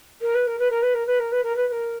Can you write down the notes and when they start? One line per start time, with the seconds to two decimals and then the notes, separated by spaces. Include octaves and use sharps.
0.21 A#4
0.34 B4
0.46 A#4
0.58 B4
0.70 A#4
0.82 B4
0.94 A#4
1.06 B4
1.19 A#4
1.31 B4
1.43 A#4
1.56 B4
1.67 B4
1.71 A#4